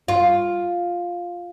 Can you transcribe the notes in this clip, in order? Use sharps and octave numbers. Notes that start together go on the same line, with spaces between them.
F4